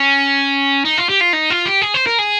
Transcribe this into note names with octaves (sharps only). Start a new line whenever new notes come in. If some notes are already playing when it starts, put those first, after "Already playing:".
Already playing: C#4
D#4
F4
G4
F4
D#4
F4
G4
G#4
C5
A#4
G#4